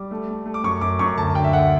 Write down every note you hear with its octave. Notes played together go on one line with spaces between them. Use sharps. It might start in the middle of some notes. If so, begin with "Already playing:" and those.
Already playing: G3 D6
A3
A3
A3
D6
F#2 C#6
F#2 D6
F#2 C#6
D2 A5
D3 G5
E5
D2 F#5